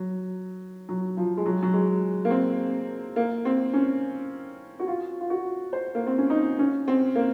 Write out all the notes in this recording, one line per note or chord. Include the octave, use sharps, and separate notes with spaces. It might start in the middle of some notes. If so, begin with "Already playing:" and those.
Already playing: F#3
F#3
F3
G#3
F#3
F#3
G#3
A#3
C4
A#3
C4
C#4
F#4
F4
F4
F#4
C5
A#3
C4
C#4
D#4
C#4
C4
A#3